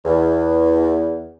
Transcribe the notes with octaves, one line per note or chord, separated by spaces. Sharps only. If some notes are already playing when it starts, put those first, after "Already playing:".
E2